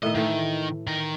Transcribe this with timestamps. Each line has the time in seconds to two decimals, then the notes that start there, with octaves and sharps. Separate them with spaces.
0.03 A2 D#3 D#5 E5
0.15 D#3 E3 A3
0.87 D#3 A#4